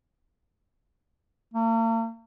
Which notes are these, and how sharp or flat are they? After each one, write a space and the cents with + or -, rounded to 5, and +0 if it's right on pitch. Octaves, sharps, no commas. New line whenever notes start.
A#3 -45